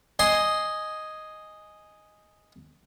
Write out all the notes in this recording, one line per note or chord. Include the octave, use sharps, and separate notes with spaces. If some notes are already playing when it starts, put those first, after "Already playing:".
D#5 G#5 C6